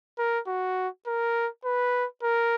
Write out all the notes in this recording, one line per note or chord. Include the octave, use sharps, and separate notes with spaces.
A#4
F#4
A#4
B4
A#4